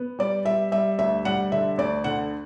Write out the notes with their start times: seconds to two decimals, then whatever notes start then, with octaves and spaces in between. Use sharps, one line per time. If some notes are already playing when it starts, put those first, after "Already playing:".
Already playing: B3
0.19 G3 D5
0.45 G3 E5
0.72 G3 E5
0.99 D2 E5
1.25 G3 F#5
1.52 D3 E5
1.78 D2 D5
2.04 D3 F#5